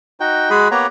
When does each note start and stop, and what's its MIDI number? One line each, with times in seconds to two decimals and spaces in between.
0.20 0.50 63
0.20 0.50 66
0.20 0.50 79
0.50 0.68 56
0.50 0.68 66
0.50 0.68 68
0.50 0.68 83
0.71 0.87 58
0.71 0.87 59
0.71 0.87 67
0.71 0.87 73
0.71 0.87 78
0.71 0.87 82